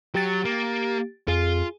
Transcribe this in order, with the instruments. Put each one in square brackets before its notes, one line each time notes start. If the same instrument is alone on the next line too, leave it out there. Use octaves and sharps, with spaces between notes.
[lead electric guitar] F#3 [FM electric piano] G4 A6
[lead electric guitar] A#3
[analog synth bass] F2 [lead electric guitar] F4 [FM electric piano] G#4